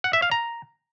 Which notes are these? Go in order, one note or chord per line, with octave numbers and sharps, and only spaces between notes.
F#5
E5
F5
A#5